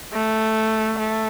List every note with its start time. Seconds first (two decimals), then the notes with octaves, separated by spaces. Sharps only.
0.13 A3
0.99 A3